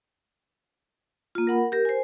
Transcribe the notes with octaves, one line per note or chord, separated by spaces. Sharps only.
A#3 F4
A#4 F#5 B5
G4 A#4
C5 G#5